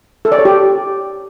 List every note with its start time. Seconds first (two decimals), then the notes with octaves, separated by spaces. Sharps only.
0.25 A4
0.32 D5
0.39 C#5
0.45 G4